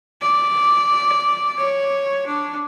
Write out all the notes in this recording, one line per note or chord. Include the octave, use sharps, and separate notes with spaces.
D5
C#5
D4